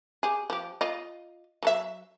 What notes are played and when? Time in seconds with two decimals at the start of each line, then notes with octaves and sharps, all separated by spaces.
0.23 G4 G#4
0.50 F3 G4
0.81 F4 D#5
1.63 F#3 A4 E5